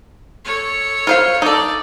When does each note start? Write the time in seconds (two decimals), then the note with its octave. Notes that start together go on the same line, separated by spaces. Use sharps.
0.45 A4 C#5
1.07 F4 C5 F5
1.42 D#4 A4 D5